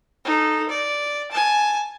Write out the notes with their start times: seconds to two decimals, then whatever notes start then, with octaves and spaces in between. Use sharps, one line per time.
0.25 D#4 A4
0.69 D5
1.31 G#5 A5